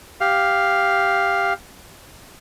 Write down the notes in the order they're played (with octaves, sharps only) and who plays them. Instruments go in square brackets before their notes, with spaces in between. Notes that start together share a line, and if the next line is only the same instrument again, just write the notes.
[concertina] G4 F5